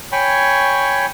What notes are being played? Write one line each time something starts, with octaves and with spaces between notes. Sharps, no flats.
C#5 G5 G#5 B5 C#6